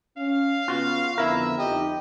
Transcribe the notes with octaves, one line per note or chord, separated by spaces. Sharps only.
C#4 F5
C#3 B3 C#4 F4 F#4
F2 D3 B3 E4 A#4 E5
F2 D#4 G4 D#5